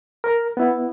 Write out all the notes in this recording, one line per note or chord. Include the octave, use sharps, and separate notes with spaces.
A#4
B3 E4